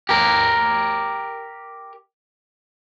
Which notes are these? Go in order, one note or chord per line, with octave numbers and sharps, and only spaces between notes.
G4 A#4